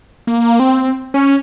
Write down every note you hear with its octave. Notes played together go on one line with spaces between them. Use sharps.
A#3
C4
C#4